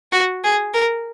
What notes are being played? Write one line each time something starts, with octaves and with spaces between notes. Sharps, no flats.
F#4
G#4
A#4